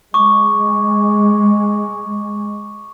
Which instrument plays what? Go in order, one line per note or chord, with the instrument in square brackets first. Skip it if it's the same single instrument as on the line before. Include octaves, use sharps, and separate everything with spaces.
[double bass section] G#3 [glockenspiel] C#6 D6